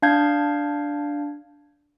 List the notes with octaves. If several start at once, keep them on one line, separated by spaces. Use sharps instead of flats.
D4 F5 A5 G6 G#6